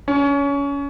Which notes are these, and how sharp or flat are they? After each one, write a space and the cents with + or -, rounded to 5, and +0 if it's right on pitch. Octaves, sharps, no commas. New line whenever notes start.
C#4 +25